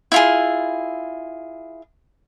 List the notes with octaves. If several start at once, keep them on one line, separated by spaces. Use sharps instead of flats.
E4 F4 G#4